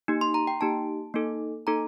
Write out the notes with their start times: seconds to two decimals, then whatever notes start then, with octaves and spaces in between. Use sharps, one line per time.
0.08 A#3 D#4 G4
0.21 C6
0.34 A#5
0.47 G5
0.61 A#3 D#4 G4 A5
1.14 A#3 D#4 A4
1.67 A#3 D#4 A4 A#5